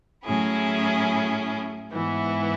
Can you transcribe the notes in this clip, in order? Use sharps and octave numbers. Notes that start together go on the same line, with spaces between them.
A2 F#3 C#4 E4 G#4
G#2 E3 B3 E4